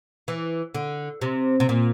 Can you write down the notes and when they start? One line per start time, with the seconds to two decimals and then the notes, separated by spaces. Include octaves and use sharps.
0.28 E3
0.75 D3
1.22 C3
1.60 C3
1.69 A#2